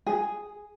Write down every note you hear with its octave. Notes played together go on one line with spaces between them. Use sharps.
G#4